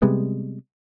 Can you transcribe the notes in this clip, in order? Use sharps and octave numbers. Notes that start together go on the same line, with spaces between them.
C3 G3 G#3 B3